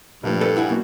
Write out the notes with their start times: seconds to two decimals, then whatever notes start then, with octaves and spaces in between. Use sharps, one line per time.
0.24 G2 A#2 F3 A3
0.41 A4 B4
0.56 E4 F#5 G#5
0.69 F#2 B2 A#3 F#4